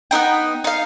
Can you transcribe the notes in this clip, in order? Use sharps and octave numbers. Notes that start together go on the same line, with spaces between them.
B3 C4 D#4 G5
D#4 F5